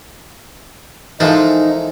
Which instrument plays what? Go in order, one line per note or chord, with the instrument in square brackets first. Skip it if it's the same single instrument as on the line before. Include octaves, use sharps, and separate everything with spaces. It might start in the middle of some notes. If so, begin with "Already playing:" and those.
[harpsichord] E3 A4 A#4 [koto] F3 G#3 [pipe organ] D#4